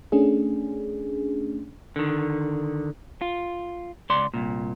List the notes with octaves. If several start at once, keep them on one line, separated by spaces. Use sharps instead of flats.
A3 C#4 D4 G#4
D3 D#3
F4
C#2 D5 C6
C2 A#2